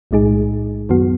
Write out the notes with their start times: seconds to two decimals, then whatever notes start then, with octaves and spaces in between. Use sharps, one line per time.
0.11 B1 A2 G#3 D#4 G#4
0.89 F#2 D#3 F#3 B3 F#4